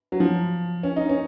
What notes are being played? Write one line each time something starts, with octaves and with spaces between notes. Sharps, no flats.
F#3
F3
C#4
D#4
C#4